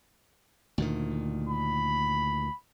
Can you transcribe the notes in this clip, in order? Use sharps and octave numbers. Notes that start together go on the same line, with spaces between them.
D2 A#2 D#3
B5